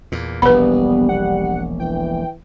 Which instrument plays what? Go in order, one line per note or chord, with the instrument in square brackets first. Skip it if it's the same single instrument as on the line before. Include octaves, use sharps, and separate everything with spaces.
[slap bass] E2 A#2
[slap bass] E1 A#1 [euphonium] G3 [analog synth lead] B3 [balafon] B4 B5
[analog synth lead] F#5
[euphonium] E3 [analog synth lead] G5